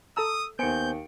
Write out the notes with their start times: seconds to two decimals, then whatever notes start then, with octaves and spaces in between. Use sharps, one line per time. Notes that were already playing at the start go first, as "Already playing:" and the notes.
0.17 A4 A5 A#5 D#6 E6
0.59 D#2 B3 C5 G#5 G6 C#7 D7